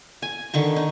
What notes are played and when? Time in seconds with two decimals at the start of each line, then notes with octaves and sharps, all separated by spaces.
0.22 G#5
0.54 D3 D#3 C#6
0.76 D#4